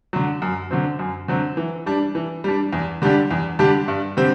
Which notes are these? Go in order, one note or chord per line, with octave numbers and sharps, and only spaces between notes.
D3 F#3
F#2
D3 F#3 C4
F#2
D3 F#3 C4
E3
G3 D4
E3
G3 D4
E2
D3 G3 D4 G4
E2
D3 G3 D4 G4
G2
D3 G3 C4 G4